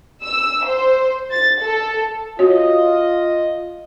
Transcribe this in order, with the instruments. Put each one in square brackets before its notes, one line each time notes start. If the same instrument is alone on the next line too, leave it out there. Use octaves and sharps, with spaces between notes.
[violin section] E6
C5
A6
A4
[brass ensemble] F4 D#5 [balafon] F#4 C#5